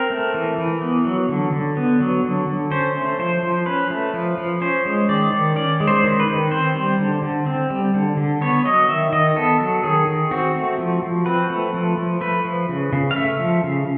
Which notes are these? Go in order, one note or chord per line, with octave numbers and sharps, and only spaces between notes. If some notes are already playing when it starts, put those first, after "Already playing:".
Already playing: C4 A#4
A3
E3
E3
B3
F#3
D3
D3
B3
F#3
D3
D3
C#4 C5
A3
F3 C5
F3
C#4 B4
A3
F3
F3
C#4 C5
G#3
D#3 D5
D#3
C#4 D5
G#3
C5
D#3
B4
D#3
C4 C5
G3
D3
D3
C4
G3
D3
D3
B3 C#5
F#3 D#5
D#3 E5
D#3 D#5
B3 A4
F#3
D#3 G#4
D#3
C4 F#4
A3
F3
F3
C4 B4
A3
F3
F3
A3 B4
F3
C#3
C#3
F5
A3 E5
F3
C#3